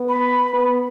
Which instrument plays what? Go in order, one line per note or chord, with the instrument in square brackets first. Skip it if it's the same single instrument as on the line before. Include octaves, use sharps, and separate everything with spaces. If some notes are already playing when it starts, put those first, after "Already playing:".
Already playing: [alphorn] B3
[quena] B5
[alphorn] B3